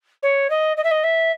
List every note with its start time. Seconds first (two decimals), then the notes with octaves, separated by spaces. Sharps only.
0.22 C#5
0.50 D#5
0.76 D#5
0.83 E5
0.91 D#5
1.03 E5